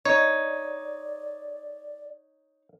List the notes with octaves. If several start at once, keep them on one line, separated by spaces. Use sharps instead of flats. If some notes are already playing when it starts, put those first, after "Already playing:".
D#4 C#5 D5